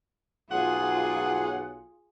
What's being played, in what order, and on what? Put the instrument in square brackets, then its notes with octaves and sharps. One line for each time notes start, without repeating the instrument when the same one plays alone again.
[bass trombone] B1 [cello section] F4 G#4 [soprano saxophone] F#5